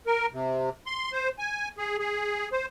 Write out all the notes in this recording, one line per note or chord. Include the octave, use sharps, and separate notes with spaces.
A#4
C3
C6
C5
G#5
G#4
G#4
C5